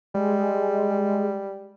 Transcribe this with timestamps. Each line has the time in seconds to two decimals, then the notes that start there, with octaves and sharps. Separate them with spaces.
0.15 G3 G#3